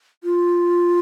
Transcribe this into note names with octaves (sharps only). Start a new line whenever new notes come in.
F4